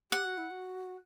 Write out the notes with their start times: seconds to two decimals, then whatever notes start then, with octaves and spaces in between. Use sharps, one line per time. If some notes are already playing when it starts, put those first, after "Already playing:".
0.12 G4 F#5
0.25 F#4
0.38 E4
0.50 F#4